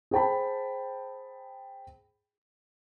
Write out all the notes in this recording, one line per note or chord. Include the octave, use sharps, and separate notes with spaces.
G#4 C5 G5 A5 B5